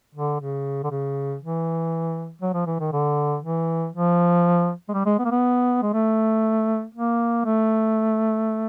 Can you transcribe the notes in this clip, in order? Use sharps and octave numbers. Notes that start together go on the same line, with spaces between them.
D3
C#3
D3
C#3
E3
F#3
F3
E3
D#3
D3
E3
F3
G#3
G3
G#3
B3
A#3
B3
G#3
A3
A#3
A3